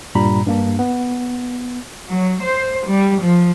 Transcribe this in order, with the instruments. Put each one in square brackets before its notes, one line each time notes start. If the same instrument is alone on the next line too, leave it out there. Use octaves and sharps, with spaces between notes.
[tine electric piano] G2 A#2 G3 A#5 B5
G2 A#3 D4
B3
[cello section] F#3
C5
G3
F3